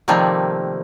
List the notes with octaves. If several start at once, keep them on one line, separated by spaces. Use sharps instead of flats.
C3 D#3 F3 G3 A3 A#3